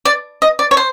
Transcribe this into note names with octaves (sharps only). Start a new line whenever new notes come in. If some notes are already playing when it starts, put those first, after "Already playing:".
D5
D#5
D5
C#5
C5